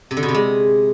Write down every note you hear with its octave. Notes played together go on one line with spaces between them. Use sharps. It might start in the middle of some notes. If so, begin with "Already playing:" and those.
C3
D3
B2
C3
G#3